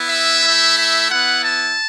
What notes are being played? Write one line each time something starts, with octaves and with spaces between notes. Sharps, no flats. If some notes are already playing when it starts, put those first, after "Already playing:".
Already playing: B3 E4
E5
A3 E4
E5
B3 E4 F#5
A5